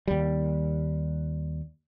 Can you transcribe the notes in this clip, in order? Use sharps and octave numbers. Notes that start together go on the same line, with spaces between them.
D#2 G3